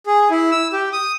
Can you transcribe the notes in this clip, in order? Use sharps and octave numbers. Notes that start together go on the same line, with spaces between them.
G#4
E4
E6
G4
D#6